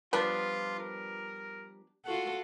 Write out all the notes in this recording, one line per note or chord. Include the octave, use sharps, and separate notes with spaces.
F3 G3 B3 D4 F4
A#4
F4 F#4 A4 F#5